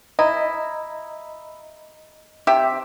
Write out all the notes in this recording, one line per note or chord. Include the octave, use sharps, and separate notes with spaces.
E4 D#5 A#5
C3 G4 E5